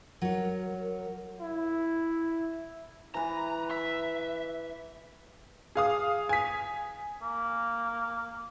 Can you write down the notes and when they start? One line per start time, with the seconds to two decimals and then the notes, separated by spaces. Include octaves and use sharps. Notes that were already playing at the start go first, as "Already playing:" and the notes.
0.22 F#3 A#4 C#5
1.40 E4
3.14 E3 B4 A#5
3.71 E5
5.75 G#4 F5 D#6
6.29 G#5 B6
7.22 A#3